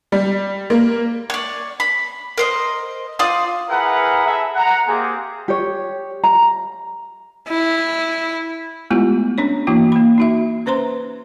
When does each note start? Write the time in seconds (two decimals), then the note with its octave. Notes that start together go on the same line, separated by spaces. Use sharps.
0.12 G3
0.70 A#3
1.30 C#5 D5
1.80 B5
2.38 A#4 C5 D#5
3.19 F4 C5 D5 D#6
3.68 E4 G#4 A#4 B4 F#5 A#5
4.25 G#4 A4 E5
4.55 F#5 A#5
4.86 A#3 C4 G4 G#4
5.48 G4 C#5
6.24 A#5
7.49 E4
8.90 G#3 A3 B3 E4 F4 G4
9.38 C#4 D4 C#5
9.67 E3 A#3 E4 F#4
9.92 A#3 B5
10.18 D#4 F#4 E5
10.66 C#4 B4 C5 A#5 C6